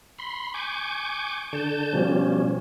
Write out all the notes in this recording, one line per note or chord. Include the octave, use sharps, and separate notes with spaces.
B5 C6
G#5 C#6 D6 G6
D3 A5 G6
B2 F3 G3 C#4